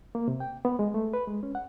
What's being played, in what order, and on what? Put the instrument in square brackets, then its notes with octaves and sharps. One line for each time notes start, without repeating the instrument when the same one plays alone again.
[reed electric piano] A#3
C3
G5
B3
G#3
A3
B4
G#3
C#4
F#5